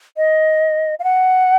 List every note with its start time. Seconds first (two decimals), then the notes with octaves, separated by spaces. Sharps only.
0.17 D#5
0.99 F5
1.04 F#5